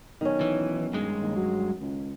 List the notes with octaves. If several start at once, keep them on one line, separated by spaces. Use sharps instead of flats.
B1 D#3 C#4
E3
G2 G#3
D#2
F#3
C#2